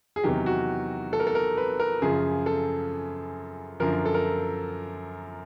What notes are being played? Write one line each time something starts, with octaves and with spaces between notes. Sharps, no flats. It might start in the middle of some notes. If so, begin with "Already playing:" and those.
G#4
E2 C3 D#3 F#3 G4
F#4
A4
A#4
A4
A#4
B4
A#4
F#2 C#3 F3 G#4
A4
F#2 D3 F3 A#4
A4
A#4